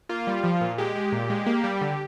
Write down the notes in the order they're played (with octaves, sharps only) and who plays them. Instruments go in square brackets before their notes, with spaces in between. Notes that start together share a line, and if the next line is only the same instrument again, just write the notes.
[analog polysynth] A#3 F4
G3
F3
A#2
G#3 G4
G#3
A#2
G#3
A#3
G3
D3